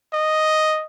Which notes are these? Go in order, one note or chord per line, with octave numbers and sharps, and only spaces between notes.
D#5